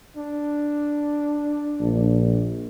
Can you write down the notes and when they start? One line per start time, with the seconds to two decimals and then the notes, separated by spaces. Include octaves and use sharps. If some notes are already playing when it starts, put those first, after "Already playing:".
0.16 D4
1.80 A#1